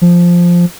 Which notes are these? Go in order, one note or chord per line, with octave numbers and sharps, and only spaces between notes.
F3